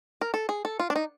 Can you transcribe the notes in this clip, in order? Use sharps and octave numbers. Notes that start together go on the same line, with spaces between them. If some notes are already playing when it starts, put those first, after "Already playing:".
A#4
A4
G#4
A4
F4
D4
D#4